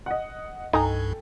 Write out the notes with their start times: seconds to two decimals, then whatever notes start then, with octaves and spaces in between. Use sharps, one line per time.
0.06 D#5 F#5
0.73 C2 G2 D#4 A4 G5 G#5 A#5